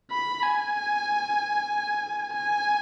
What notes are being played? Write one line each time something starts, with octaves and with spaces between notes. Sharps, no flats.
B5
G#5
G#5